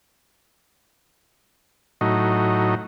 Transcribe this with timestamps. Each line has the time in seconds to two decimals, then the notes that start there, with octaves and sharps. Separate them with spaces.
2.01 A2 F#3 D#4